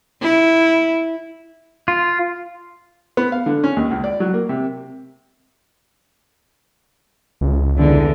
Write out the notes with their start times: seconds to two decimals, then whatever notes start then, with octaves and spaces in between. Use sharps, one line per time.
0.22 E4
1.88 F4
3.17 B3
3.32 F5
3.46 D3
3.64 C#4
3.76 D#2
3.91 C#2
4.04 D5
4.20 F#3
4.34 A#3
4.49 C3
7.41 C#2
7.79 E2 D3